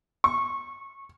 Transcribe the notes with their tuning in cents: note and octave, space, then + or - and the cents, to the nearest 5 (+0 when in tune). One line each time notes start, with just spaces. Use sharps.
C#6 -25